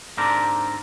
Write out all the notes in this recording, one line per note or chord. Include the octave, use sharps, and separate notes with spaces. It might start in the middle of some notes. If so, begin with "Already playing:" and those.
G#2 D3 C4 D4 G4 A#4